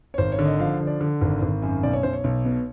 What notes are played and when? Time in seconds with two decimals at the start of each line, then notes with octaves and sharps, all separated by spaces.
0.14 C#5
0.18 G#1 C5
0.32 C#5
0.39 D3
0.45 D#5
0.59 F3 F5
0.80 D3
0.87 D5
1.01 D3
1.21 G#1
1.42 G#1
1.62 F#2
1.83 B1 D5
1.93 C#5
2.03 B1 C5
2.13 C#5
2.24 B1
2.45 B2